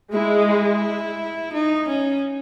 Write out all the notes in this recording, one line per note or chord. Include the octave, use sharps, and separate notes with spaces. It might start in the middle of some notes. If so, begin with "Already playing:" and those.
G#3 E4
E4
D#4
C#4